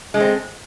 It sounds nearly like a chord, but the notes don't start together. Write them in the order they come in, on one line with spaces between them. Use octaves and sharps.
G#3 A3 C4